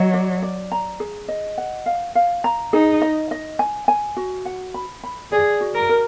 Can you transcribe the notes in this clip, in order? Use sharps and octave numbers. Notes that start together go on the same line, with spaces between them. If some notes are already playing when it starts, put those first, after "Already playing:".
Already playing: F#3 D#5
D5
D5
A#5
G#4
D#5
F#5
F5
F5
A#5
D#4 G#4
D#5
D#5
G#5
G#5
F#4
F#5
B5
B5
G#4 D5
F#4
A#4
A#4